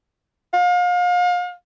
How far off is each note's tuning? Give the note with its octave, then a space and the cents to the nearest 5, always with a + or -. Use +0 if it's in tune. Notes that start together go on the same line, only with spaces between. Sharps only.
F5 +35